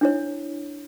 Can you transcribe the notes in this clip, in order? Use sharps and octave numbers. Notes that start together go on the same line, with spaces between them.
D4 E4 C#5